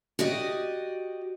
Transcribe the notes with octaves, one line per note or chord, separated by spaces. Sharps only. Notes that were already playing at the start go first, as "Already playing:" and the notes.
F#4 G4 D5 D#5